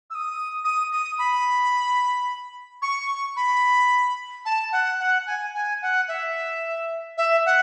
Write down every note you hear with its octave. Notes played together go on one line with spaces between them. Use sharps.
E6
D#6
D#6
D#6
B5
C#6
B5
A5
F#5
F#5
G#5
G#5
F#5
E5
E5
F#5